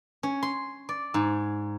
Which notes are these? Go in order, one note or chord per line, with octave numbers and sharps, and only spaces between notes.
C#4
C6
D5
G#2